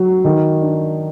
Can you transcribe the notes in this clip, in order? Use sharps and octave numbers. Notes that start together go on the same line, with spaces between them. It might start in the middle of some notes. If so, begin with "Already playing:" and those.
Already playing: F#3 F#4
D#3
D4